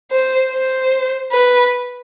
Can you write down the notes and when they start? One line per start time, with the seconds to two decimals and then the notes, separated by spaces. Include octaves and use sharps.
0.11 C5
0.52 C5
1.32 B4